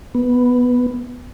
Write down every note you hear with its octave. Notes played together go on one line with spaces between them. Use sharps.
B3